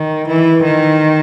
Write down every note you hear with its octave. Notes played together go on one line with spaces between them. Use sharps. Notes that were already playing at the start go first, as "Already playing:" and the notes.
Already playing: D#3
E3
D#3